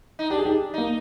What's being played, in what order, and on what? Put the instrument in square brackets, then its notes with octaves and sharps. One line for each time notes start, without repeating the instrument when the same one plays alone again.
[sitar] D#4
[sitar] D4 [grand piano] G4
[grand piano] G#4
D#4 G4
[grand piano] A#3 [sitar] D#4